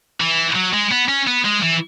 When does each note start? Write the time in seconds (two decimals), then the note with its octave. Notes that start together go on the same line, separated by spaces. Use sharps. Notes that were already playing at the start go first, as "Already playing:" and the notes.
0.20 E3
0.55 F#3
0.74 G#3
0.91 B3
1.09 C#4
1.27 B3
1.45 G#3
1.63 E3